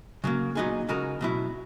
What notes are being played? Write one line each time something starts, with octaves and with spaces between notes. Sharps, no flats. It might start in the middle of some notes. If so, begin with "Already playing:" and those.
C#3 F#3 A#3
A#2 F#3 B3 D#4 G#4
C#3 G#3 D#4 F#4 A#4
B2 F#3 B3 E4